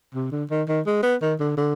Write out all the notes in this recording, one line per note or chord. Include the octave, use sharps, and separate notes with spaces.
C3
D3
D#3
D#3
G#3
B3
D#3
D3
D3